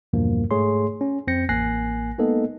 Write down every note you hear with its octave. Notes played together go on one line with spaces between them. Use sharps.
E2 G2 B2 F3 A#3
G#2 A3 G#4 C#5 C6
C#4
F2 C4 G6 A#6 C#7
A1 A#3 G#5 F#6 A#6 C7
G#3 A#3 B3 D#4 A4 D#5